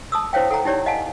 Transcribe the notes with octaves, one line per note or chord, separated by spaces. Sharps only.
A5 D#6 E6
E4 C5 C#5 F5 G5
A4 F#5 G5 A#5
D#4 E4 G4 C#5 D5
D#5 F5 F#5 G#5 A5